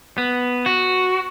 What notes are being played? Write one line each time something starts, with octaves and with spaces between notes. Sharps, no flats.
B3
F#4